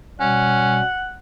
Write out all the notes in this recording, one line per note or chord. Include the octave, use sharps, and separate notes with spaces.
B2 G3 C#4 F#5